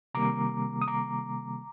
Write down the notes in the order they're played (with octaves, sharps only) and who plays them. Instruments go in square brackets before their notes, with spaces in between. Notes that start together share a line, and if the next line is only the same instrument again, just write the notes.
[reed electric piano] C3 D#3 G3 A#3 A#5 D6
D#6
A#5 D6